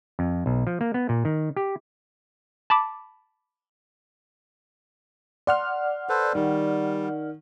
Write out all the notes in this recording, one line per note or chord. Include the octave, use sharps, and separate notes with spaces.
F2
B1
F3
A#3
B3
A#2
D#3
G4
A5 B5 D6
D5 F#5 C6 F6
A4 B4 C5
D#3 G3